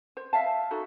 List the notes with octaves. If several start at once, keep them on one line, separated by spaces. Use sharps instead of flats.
C5
E5 F5 A5
D#4 F#4 A4